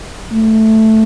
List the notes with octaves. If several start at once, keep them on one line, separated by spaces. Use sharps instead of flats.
A3